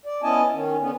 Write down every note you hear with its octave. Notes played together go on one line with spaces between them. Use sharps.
D5
B3 C#4 E4 D#5 G#5 A5
D#3 C#4
D3 B3 C#4